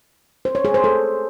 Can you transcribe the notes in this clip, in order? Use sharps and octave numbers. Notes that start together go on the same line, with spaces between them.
C5
C#5
G#4
C5
A4